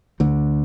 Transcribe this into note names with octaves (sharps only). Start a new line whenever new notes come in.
D2 D3